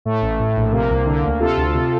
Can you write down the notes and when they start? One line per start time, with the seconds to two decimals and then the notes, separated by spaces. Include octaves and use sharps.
0.05 A2 A3
0.22 A1
0.39 A2
0.56 A#1
0.72 C3 A#3
0.90 C2
1.06 D3
1.24 D2
1.40 C3 F4 A4
1.57 D2
1.74 C3